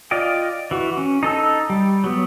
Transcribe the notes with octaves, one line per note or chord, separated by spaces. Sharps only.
F4 D5 D#5 G5
E3 F#4
C#4
D#4 A4 E6
G3
F#3 B3